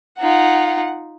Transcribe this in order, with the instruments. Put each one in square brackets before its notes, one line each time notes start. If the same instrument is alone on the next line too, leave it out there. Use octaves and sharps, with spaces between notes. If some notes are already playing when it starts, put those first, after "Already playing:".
[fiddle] D#4 F4 [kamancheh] F#5